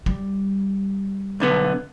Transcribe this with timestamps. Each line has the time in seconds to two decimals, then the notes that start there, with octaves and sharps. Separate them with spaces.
0.06 G3
1.40 B1 D3 B3